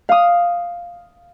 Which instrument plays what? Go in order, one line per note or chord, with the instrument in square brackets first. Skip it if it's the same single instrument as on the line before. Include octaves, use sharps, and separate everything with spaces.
[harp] F5 D#6